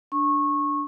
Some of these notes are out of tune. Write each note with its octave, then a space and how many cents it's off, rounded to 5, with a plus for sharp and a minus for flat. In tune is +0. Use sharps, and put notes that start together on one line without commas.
D4 +0 C#6 -20